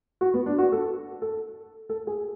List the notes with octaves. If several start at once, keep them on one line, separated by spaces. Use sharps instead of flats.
F#4
B3
D4
F#4
A4
A4
A4
G#4